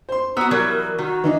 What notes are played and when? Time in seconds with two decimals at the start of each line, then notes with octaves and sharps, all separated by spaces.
0.09 C5 C6
0.37 B3 F#4 A#5 D#6 E6
0.51 E3 F#3 G3 A#4
0.98 D#3 F#4
1.24 E3 D4 D#4